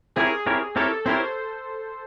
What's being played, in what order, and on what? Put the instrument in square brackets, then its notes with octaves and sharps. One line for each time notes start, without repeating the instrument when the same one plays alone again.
[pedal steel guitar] C4 E4 G4 A#4 C#5 [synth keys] G#4
[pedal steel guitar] C4 E4 G4 A#4 C#5
[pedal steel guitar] C4 E4 G4 A#4 C#5 [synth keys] A4
[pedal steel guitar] C4 E4 G4 A#4 C#5 [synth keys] C5